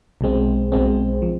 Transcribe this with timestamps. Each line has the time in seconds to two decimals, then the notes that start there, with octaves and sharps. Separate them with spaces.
0.21 B1 B2 G#3 C4
0.72 B1 B2 G#3 C4
1.22 F3